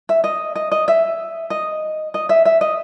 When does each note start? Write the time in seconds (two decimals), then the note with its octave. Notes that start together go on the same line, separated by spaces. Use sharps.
0.09 E5
0.24 D#5
0.55 D#5
0.72 D#5
0.88 E5
1.50 D#5
2.14 D#5
2.29 E5
2.45 E5
2.61 D#5